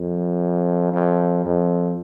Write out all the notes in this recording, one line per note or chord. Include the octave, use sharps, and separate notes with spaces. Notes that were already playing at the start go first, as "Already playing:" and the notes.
Already playing: F2
F2
F2